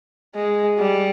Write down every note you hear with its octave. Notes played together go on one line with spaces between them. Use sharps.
G#3
G3